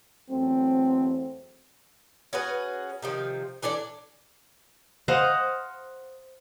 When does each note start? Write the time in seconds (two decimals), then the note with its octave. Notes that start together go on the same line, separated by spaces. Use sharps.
0.29 E2 F#3 A3 C4
2.33 C#4 F#4 G#4 B4
3.02 C3 D#3 F3
3.63 E3 D4 A4 D5
5.08 C5 D#5 F5 F#5